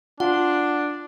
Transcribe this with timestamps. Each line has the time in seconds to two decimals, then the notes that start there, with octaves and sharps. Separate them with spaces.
0.20 D4 F4 F#5